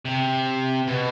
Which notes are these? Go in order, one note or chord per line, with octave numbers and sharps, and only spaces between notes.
C3
B2